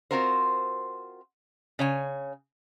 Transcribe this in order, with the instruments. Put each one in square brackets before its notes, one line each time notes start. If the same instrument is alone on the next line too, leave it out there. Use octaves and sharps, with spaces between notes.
[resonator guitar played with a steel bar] C4 F4 F#4 A#4 C5
C#3 C#5 G#5